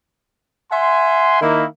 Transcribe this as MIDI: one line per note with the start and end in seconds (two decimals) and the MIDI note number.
0.72 1.38 76
0.72 1.38 78
0.72 1.38 80
0.72 1.38 84
1.42 1.65 51
1.42 1.65 58
1.42 1.65 64